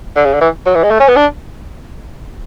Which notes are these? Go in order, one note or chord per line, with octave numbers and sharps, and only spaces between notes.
D3
C#3
D3
E3
F#3
E3
G#3
A3
C#4
B3
D4